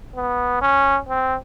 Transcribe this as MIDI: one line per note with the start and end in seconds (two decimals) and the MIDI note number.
0.16 0.61 59
0.62 0.97 61
1.09 1.35 60